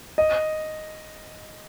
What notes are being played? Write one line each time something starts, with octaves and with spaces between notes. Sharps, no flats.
D#5